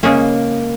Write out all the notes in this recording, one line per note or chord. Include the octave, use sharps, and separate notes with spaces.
C#3 G#3 A#3 C#4 G#4